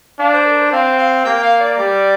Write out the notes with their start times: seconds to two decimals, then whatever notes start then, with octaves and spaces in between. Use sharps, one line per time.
0.19 D4 F5
0.33 C5
0.46 A#4
0.59 C5
0.72 C4 F5
0.98 F5
1.25 A#3 G5
1.43 F5
1.60 D5
1.78 G3